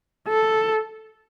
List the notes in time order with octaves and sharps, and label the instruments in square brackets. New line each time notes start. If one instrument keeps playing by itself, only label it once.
[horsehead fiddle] A4